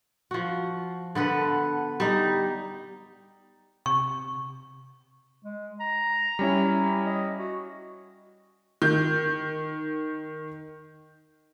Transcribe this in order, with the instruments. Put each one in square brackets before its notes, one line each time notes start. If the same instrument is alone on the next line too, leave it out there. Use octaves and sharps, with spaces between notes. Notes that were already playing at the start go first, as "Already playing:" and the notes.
[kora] F3 F#4
D3 B3 A4 B4
G3 D#4
[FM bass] C3 [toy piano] C#6
[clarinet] G#3
A#5
[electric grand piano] G3 C#4 E4
[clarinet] D#5
F#4
[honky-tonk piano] D#3 G6